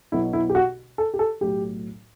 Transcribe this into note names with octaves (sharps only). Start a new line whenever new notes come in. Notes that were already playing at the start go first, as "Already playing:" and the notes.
B1 B2 F#3 E4
E4
G4
F#4
A4
G4
A4
B1 A2 F#3 G4